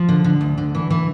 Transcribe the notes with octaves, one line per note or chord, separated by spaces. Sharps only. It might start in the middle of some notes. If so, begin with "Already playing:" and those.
Already playing: F3
D3
D3
D2
D3
E3
E3